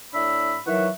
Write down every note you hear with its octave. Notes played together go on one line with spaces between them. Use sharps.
A2 D4 E5 B5 E6
D#3 E3 F#3 E5 F#5 C#6